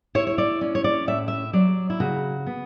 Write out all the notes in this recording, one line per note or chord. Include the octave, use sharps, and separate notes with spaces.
E4 C#5
C#5
D5
C#4
C#5
D5
A2 E5
E5
F#3 D5
E4
C#3 F#4
B3